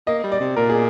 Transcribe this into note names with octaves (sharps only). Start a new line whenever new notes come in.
A#3 D#5
G3
D5
C3
A#2 A#4
G#4